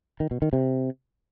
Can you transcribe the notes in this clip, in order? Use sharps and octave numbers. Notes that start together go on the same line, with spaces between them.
D#3
B2
D#3
C3